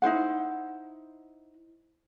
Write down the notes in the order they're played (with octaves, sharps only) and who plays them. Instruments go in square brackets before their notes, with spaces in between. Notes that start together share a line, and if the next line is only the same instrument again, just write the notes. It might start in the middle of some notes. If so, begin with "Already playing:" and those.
[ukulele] D#4 E4 C5 F#5